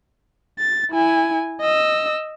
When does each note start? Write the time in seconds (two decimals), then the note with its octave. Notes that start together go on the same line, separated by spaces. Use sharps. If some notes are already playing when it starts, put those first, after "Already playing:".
0.59 A6
0.91 E4 G#5
1.61 D#5 E6